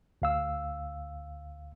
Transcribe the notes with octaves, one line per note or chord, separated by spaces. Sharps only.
D2 F5 E6